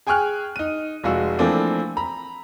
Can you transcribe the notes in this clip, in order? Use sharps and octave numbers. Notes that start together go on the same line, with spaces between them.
G#4 G5 G#5 C#6 F6 F#6
D#4 D#7
F1 G#3 F4 F#4 E6
E3 F3 A3 A#3 C4 D4
A#5 B5